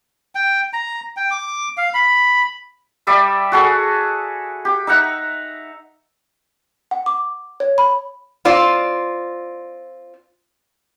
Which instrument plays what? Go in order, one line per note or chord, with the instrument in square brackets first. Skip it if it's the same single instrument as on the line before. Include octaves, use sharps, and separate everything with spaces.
[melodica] G5
A#5
G5
D6
F5
B5
[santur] G3 D5 E5 D#6
F#4 G#4 A4
G4
D#4 E5 F#5 A#5
[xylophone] F#5
D6
C#5
B5
[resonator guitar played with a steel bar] C4 F4 D5